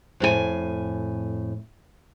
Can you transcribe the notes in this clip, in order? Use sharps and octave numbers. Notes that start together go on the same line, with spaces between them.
F2 A2 F#4 G#5